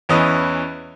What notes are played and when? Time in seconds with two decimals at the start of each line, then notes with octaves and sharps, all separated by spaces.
0.09 E2 E3 C#4 D#5